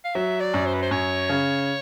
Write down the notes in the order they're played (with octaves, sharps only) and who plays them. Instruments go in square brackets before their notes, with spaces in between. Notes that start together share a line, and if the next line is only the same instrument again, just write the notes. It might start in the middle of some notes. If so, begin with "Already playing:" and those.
[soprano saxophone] F5
[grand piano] F#3 [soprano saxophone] E5
[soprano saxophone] D5
[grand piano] F#2
[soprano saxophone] C5
B4
C5
[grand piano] F#2 [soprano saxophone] C#5
[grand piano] C#3